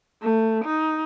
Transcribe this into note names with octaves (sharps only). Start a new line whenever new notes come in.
A3
D#4